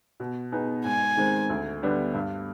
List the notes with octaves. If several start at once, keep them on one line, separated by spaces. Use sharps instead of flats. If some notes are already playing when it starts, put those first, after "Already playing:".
B2
B3 D#4 G#4
G#2 G#5
D#3 G#3 C4
D2
D3 G3 B3 D4
G2